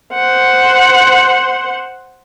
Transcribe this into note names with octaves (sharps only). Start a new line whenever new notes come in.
C5 F#5